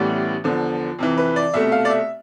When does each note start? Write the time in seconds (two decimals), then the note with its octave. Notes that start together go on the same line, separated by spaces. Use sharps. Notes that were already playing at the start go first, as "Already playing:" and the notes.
Already playing: A1 A2 E3 G3 B3
0.44 E2 D3 F3
0.99 F2 C3 E3
1.18 B4
1.36 D5
1.54 C2 B2 A3 E5
1.72 F5
1.85 D5
1.90 E5